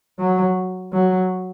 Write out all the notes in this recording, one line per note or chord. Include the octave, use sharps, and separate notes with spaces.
F#3
F#3